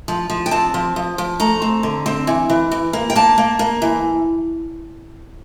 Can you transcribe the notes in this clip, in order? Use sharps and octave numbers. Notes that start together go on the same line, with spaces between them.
F3
F3
G5
C4 A5
F3
F3
F3
A3 A#5
C4
D3
C4
E3
E3
E3
A#3
G5
A#3 A5
A#3
A#3
E3